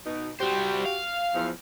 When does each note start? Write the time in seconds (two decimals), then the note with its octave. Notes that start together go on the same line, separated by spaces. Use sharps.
0.06 B2 D#4
0.40 G3 F#4 G4 C5
0.86 F5
1.34 E2 F3